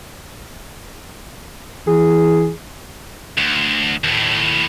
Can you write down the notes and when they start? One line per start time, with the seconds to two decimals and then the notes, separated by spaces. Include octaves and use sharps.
1.87 E3 G#4
3.38 D2
4.04 D#2 A2